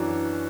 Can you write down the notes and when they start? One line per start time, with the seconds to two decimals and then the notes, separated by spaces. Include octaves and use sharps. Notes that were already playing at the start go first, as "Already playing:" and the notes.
Already playing: F#2 E3 D4 F#4